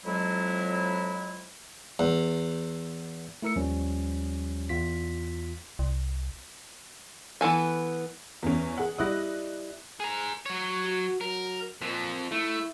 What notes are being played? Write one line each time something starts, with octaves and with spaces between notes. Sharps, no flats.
F2 F#3 G#3 E4
E2
A3 E4 A#4 E6 C#7
D#2 F3 G3 C#4
E2 F4 B6
C2
E3 B3 A4 G#5
E2 C#4
G#4 F#5
G3 E4 D#5 D#6 F#6 A#6
G#4 A#5
F#3 C#5
F#4
F#3 A#4
F2 A#2 F3
A3 E4